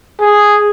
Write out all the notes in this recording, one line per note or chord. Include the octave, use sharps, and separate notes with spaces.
G#4